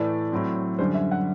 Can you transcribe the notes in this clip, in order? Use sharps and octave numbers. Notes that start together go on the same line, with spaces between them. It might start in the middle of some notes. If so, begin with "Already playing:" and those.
Already playing: A2 E3 A3 D5
A2 F#3 C4
F#2 D3 G3 C5
E5
F#5